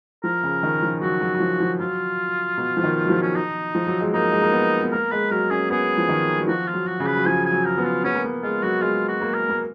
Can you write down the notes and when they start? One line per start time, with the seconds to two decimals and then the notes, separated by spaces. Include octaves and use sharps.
0.24 F3 A#4
0.43 C#3
0.63 D#3
0.82 F3
1.01 F#3 F#4
1.21 F#3
1.35 F#3
1.40 F3
1.60 F3
1.80 F#3 F4
2.58 B2
2.77 F3
2.84 D#3
3.05 F#3
3.10 F3
3.22 C#4
3.36 D#4
3.75 F3
3.87 F#3
4.01 G#3
4.14 A#3 D#4
4.32 G#3
4.42 A#3
4.52 B3
4.83 B3
4.92 A#3 A#4
5.11 G#3 B4
5.31 F#3 A#4
5.50 C#4 G#4
5.70 B3 G#4
5.98 F3
6.09 D#3
6.39 F#3
6.48 F3 F#4
6.68 F4
6.74 F#3
6.87 F#4
7.00 C#3
7.06 B4
7.16 F#3
7.26 F3 G#5
7.45 G#5
7.52 F#3
7.65 A#4
7.78 B3
7.85 F4
8.04 B3 C#4
8.14 A#3
8.24 B3
8.43 G#3 F4
8.63 F#3 F#4
8.82 G#3 F4
9.08 F#4
9.21 A#3
9.34 A#4
9.49 A#3